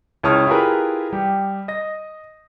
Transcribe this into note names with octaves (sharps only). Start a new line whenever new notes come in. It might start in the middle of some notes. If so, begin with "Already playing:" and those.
C#2 E4 C#5 A5 D#6 F6
E4 F4 G4 G#4 A#4 B4
G3 G4
D#5 A#6